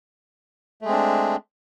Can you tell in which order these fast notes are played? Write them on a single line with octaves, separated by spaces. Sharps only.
A3 G#3 C4 D4